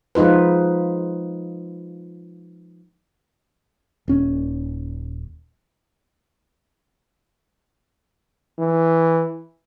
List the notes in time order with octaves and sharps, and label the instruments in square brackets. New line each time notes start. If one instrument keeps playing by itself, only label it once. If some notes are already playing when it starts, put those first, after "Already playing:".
[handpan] F3 G#3 D#4 F4 B4
[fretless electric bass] D#1 C#4
[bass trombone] E3